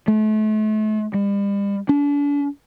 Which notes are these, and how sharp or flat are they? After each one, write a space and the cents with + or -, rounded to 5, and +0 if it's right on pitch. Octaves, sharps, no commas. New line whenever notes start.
A3 -35
G3 +40
D4 -40